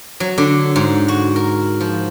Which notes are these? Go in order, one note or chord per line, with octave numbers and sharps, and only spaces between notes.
F#3
D3
G#2
F#4
A#4
F3